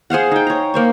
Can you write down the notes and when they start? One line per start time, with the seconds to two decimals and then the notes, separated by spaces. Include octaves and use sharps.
0.10 G#4 C5 F5 F#5
0.32 D#4 G5
0.47 C#5 A#5
0.74 A#3 C5 C#6